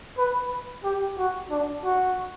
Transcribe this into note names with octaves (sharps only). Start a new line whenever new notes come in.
B4
G4
F#4
D4
F#4